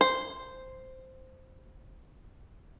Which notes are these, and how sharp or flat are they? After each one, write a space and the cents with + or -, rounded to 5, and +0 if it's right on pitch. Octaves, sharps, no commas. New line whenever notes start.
C5 -5